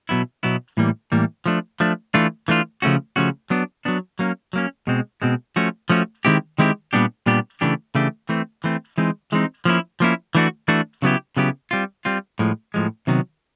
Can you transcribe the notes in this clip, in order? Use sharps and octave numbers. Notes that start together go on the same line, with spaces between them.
B2 F#3 B3 E4
B2 F#3 B3 E4
A2 E3 G3 A#3
A2 E3 G3 A#3
F3 A3 D4
F3 A3 D4
E3 A3 D4 F4
E3 A3 D4 F4
C#3 F3 A3 C#4 F#4
C#3 F3 A3 C#4 F#4
F#3 B3 D4
F#3 B3 D4
F#3 A#3 C#4
F#3 A#3 C#4
B2 G#3 C4
B2 G#3 C4
F3 A3 C#4 F#4
F3 A3 C#4 F#4
D#3 G#3 C4 E4 G4
D#3 G#3 C4 E4 G4
A#2 G3 B3 D4 G4
A#2 G3 B3 D4 G4
C#3 E3 A3 D4 G4
C#3 E3 A3 D4 G4
E3 A3 C4
E3 A3 C4
E3 G#3 C4 D#4
E3 G#3 C4 D#4
F3 A#3 C#4 E4
F3 A#3 C#4 E4
E3 A3 D4 F#4
E3 A3 D4 F#4
C#3 F#3 B3 E4 G4
C#3 F#3 B3 E4 G4
G3 C4 F4
G3 C4 F4
A2 F3 G#3
A2 F3 G#3
C3 D#3 F#3 B3